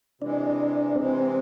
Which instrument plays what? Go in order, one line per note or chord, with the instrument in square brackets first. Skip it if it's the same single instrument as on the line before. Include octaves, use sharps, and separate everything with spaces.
[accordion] C3 E3 G#3 [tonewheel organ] D4
[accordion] C3 E3 G#3 [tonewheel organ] C4